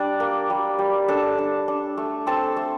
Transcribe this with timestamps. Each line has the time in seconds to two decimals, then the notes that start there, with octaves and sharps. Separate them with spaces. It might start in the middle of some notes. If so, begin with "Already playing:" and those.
Already playing: G3 D4 D5
0.20 A#3
0.50 G3
0.79 G3
1.08 D4 A4 A5
1.38 D4
1.68 D4
1.97 A3
2.27 C4 A4 A5
2.56 A3